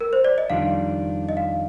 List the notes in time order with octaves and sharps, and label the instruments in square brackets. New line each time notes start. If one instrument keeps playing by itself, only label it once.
[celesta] A#4
C5
D5
D#5
[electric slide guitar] F2 D#3 G3 D4 F4 [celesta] F5
[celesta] D#5
F5